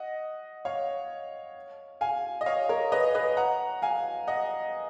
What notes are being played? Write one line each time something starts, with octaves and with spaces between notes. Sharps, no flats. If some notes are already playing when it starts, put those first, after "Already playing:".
Already playing: D#5 F#5
C#5 F5
F5 G#5
D#5
C#5 F5
A#4 C#5
B4 D#5
B4 D#5
F#5 A#5
F5 G#5
D#5 F#5